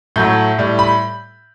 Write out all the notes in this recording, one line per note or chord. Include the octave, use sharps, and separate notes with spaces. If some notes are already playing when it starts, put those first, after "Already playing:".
A2 F#3 A3 G6
A2 G3
B5